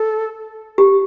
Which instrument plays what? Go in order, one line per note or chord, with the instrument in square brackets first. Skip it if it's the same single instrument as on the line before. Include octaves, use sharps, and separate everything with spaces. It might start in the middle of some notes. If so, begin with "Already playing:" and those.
Already playing: [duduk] A4
[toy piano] G4